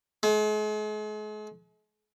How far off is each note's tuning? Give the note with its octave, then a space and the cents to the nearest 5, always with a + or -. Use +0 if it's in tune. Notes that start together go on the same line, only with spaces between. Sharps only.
G#3 +40